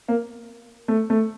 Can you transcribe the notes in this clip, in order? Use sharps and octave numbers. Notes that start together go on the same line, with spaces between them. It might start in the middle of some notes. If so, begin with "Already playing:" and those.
A#3
A3
A3